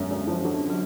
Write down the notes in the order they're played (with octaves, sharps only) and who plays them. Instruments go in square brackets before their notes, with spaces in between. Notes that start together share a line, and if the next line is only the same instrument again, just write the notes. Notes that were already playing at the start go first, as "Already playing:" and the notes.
Already playing: [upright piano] F#2 D3 [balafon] G#3
[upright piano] F#2
F3
D3
[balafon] F#3